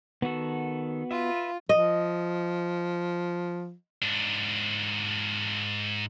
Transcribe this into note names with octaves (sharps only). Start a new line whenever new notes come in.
D#3 B3 F#4 A4
F4 B4 E5
F3 D#5
G#2 D4